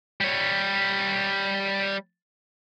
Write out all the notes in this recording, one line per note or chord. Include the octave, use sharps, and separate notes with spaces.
G3 C#5